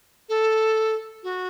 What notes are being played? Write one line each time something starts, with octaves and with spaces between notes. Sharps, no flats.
A4
F#4